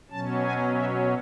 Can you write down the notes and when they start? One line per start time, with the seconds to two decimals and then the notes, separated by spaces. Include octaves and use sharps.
0.10 B2 F#3 C#4 A5
0.43 G#5
0.75 E5